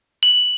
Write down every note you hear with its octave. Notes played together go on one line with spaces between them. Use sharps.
F#7